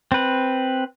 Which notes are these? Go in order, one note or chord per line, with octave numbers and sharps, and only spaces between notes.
C4 B4